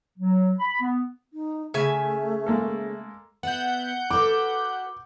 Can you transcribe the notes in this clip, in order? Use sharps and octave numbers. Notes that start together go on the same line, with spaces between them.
F#3
B5
B3
D#4
C#3 A3 E5 G#5
G#3 A#3 A4
B3 E5 F#5 G6
F#4 A4 B4 D6